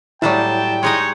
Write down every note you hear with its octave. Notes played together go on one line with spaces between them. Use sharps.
A2 F#3 G3 E4 D5 G5 A5
G#3 D#4 C#5 D#5